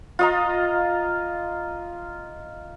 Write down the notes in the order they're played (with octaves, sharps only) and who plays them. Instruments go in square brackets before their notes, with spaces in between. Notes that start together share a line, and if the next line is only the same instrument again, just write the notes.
[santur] F4 D#5 A#5